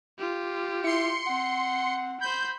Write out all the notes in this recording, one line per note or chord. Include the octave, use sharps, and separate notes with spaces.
F4 G4
E4 C6 C#7
C4 F#5
C5 B5 G6